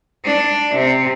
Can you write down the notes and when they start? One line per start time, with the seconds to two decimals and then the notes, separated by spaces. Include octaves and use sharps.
0.25 D4
0.75 C3